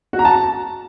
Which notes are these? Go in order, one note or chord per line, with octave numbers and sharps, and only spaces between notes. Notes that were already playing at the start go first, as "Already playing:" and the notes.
F#4
A#5
A5